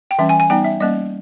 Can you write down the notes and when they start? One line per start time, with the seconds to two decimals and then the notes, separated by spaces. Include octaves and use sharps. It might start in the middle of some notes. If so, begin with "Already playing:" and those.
0.11 G5
0.19 E3 G3 C#4 E5
0.29 G#5
0.40 G#5
0.50 G3 B3 D#4 G5
0.64 E5
0.80 G3 A#3 C#4 D#5